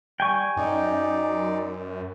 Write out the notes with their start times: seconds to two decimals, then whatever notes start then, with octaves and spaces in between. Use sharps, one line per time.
0.20 G3 G5 G#5 C#6
0.57 F#2 D#4 D5